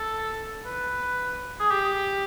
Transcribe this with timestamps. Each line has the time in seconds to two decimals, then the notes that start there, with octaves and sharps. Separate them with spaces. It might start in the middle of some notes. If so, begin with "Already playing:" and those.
Already playing: A4
0.65 B4
1.60 G#4
1.71 G4